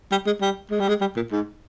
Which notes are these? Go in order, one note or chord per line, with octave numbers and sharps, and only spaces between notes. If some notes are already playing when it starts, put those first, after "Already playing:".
G3
G#3
G3
G#3
G3
G#3
G3
A#2
G#2